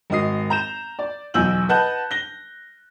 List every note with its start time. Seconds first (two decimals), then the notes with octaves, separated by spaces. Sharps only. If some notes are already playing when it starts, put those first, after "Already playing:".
0.10 G#1 F#4 D#5 D#6 C7
0.50 A#5 G6 E7
0.99 D5
1.34 B1 E2 G#5 E6 G6 F#7
1.69 B4 D#5 F#5 A5 F#6 G6
2.11 A#6 G7